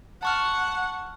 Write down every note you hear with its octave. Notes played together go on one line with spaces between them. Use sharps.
F#5 A5 C#6 F6